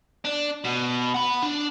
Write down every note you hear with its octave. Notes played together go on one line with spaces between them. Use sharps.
D4
B2
F#5 B5
D4